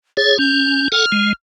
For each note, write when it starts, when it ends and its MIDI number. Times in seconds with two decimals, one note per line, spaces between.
0.17 0.38 68
0.17 0.38 73
0.17 0.34 93
0.39 0.88 61
0.39 0.90 91
0.92 1.06 69
0.92 1.06 78
0.92 1.06 80
0.92 1.32 89
1.12 1.33 56